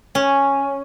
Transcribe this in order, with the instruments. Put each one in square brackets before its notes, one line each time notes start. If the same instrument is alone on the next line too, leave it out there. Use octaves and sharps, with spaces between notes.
[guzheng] C#4